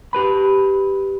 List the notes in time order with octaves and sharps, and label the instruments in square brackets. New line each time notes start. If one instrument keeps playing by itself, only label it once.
[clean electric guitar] G4 B4 B5